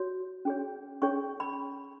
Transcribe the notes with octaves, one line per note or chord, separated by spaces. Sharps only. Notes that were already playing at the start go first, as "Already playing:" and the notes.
Already playing: F#4 C#5
C#4 G#4 C#5
C#4 G#4 C#5 C#6
B5